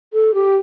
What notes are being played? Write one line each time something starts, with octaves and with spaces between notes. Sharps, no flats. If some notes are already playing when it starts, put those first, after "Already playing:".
A4
G4